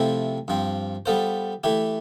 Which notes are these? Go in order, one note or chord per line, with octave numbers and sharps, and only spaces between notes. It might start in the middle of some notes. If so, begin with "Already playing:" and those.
Already playing: C3 F3 A3 C4 E4
G2 F3 C4
G3 B3 F4 A4 C5
E3 A3 E4 G4